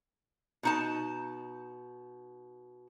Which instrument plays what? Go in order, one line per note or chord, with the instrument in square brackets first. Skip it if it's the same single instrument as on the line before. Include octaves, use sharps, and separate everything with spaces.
[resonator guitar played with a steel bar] B2 D#4 A5